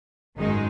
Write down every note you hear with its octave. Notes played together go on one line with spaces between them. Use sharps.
G#1 F#2 D#3 G#3 D#4